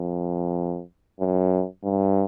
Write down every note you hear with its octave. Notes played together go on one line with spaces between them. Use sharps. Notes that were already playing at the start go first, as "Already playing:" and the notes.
Already playing: F2
F#2
G2